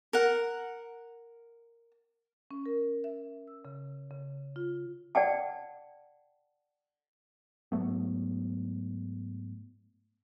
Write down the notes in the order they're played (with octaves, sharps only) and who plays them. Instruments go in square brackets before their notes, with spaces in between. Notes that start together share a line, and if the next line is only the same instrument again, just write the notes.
[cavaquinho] A#4 F#5
[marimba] C#4
A#4
E5
E6
C#3
C#3
F4
[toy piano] D5 F#5 G5 A5
[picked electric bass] G#2 F#3 A3 B3